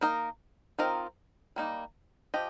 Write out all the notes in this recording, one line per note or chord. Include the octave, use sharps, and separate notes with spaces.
A#3 D#4 A#4 D#5
D#3 C4 F4 A#4 D#5
G3 A#3 D#4
F3 G4 D#5